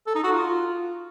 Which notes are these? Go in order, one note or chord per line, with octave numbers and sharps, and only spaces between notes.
A4
D#4
F#4
F4